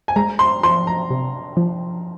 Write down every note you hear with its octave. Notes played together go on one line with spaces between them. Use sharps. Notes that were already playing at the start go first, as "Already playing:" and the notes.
G#5
G#3 A#5
C6
F3 C6
A#5
C3
F3